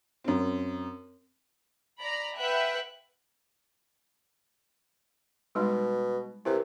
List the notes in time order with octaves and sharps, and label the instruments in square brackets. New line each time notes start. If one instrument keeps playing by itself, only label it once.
[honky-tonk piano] F#2 C4
[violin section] D5 A#5 B5
B4 E5 F#5 G5 F#6
[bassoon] B2 [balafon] G3 G#3 D#4
[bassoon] C3 [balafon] E4 A#4 B4